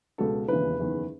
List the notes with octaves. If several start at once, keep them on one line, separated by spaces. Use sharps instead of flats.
C#2 B2 A4
E1 D#2 C#3 E3 B4
F#1 E2 D#3